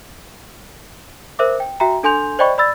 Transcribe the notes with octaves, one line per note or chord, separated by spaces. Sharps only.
A#4 C5 E5 D6
G5
F#4 E5 G5 A#5
D4 A4 G#5 C6 G6 F7
C5 D5 D#5 G5 B5 C#6
D5 B5 E6 A6